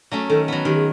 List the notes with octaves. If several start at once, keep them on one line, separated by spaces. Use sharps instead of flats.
F#3 A3 C#4
D#3 A4
F#3 B3
D#3 G4
G#4